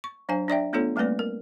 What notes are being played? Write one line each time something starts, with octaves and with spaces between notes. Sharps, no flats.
C#6
F#3 D4 C5 F5 G#5
D4 D5 E5 G5
A3 B3 D4 F4 A4 C#5
G3 A3 A#3 C4 B4 D5
A#4